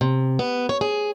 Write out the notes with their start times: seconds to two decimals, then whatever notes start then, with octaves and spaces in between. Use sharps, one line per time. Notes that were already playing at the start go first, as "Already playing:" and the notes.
0.01 C3
0.39 B3
0.69 C#5
0.81 G#4